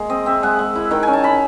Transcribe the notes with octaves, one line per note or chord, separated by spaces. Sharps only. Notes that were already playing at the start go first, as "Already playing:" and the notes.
Already playing: G#3 A#3
C4 D#5
C4 E5
G#3 F#5
G#3
E4
D#3 G5
C#4 G#5
A5
C#4 B5